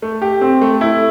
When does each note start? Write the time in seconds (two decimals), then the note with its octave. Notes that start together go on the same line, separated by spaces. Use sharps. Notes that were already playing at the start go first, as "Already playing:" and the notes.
0.02 A3
0.22 G4
0.41 C4
0.61 A3
0.81 E4